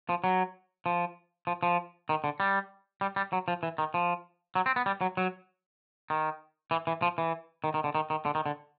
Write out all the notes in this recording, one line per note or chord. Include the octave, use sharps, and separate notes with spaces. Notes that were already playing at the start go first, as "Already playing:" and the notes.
F3
F#3
F3
F3
F3
D#3
D3
G3
G3
G3
F#3
F3
E3
D#3
F3
F#3
C4
B3
G3
F#3
F#3
D#3
E3
E3
F3
E3
D#3
D#3
D3
D#3
D#3
D3
D#3
D3